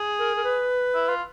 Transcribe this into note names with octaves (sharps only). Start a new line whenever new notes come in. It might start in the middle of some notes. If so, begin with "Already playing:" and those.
Already playing: G#4
A#4
A#4
B4
E4
F4